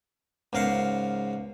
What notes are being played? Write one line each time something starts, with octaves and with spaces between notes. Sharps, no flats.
C#2 G#2 A#4 F5 F#5